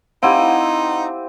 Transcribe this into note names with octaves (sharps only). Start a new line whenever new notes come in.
C4 D#4 E4 G4 F5 F#5